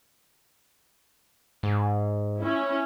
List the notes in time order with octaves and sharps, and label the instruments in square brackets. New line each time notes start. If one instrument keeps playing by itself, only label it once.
[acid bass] G#2
[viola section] C#4 E4